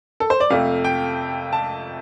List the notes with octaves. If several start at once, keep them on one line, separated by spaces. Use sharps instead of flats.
A4
C5
D5
F2 C3 A3 F5
G5
A5